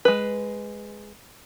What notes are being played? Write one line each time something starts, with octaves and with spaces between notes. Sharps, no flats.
G#3 B4